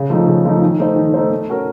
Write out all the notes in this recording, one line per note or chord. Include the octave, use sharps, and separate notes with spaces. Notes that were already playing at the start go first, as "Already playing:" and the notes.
Already playing: C#3
F3 A3 D#4
C#3
F3 A3 D#4
D#3
A3 D#4 A4 C5
D#3
A3 D#4 A4 C5
A3
C#4 F#4 A#4